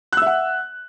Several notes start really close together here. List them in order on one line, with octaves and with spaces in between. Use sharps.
F#6 E6 E5 F#5